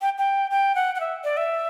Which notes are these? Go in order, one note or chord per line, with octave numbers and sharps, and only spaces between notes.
G5
G5
G5
F#5
F#5
E5
D5
E5